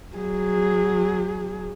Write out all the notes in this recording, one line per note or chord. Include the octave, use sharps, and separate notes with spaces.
F#3 G#4